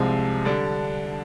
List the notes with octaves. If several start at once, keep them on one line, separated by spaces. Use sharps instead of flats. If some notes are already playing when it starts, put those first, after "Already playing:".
Already playing: C2 C3 F3 G#3
D3 G3 D4